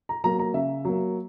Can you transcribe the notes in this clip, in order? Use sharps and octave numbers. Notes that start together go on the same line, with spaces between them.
A#5
F#3 A#3 A#5
A#5
C#3 E5
F#3 A#3